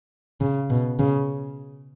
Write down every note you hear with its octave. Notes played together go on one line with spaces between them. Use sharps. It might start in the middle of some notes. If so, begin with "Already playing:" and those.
C#3
B2
C#3